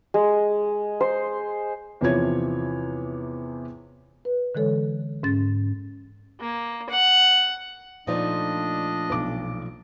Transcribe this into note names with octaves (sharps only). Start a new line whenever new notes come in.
G#3
C5
E2 C3 E3 F3 C#5 G#6
B4
D3 E3 G#3 A4 C#5
G#2 C#4 A6
A#3
F#5
A#2 F3 A3 D4 D#4 D5 D#5
B1 D6